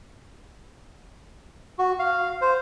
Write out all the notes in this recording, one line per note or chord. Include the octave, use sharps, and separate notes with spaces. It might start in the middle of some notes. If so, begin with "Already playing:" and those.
F#4
F5
C5